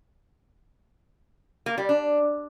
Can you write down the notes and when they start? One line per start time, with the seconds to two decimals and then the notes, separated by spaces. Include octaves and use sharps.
1.66 A#3
1.78 G3
1.89 D4